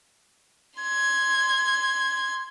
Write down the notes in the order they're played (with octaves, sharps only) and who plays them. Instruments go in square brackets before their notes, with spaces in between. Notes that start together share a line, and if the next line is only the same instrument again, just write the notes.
[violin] C6 G#6